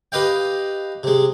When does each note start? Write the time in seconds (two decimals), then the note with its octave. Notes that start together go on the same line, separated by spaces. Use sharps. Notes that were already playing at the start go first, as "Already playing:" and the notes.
0.12 G4 B4 D#5 F5 G5
1.03 C3 G#3